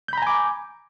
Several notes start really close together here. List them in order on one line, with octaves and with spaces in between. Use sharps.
G6 B5 A#5 G#5 D6